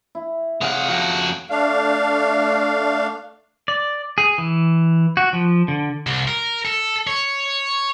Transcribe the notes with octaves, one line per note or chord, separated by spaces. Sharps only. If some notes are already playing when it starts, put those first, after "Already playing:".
E4
C3 G#4 C#5 F5 F#5
F2 F#4
A3 D4 F5
D5
G#4
E3
F#4
F3
D3
C2
A#4
A4
C#5